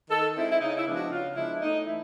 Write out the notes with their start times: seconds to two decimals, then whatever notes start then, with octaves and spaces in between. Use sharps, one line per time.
0.10 D#3 A4
0.35 G#3 C4 D#4 E4
0.51 E4
0.61 C#3 D#4
0.77 E4
0.86 F3 G#3 B3 D4
0.95 F#4
1.11 C#3 F4
1.36 F3 G#3 B3 D4 E4
1.61 A2 D#4
1.86 E3 A3 E4